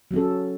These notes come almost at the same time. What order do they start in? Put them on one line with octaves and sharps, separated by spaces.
F#3 C#4 A4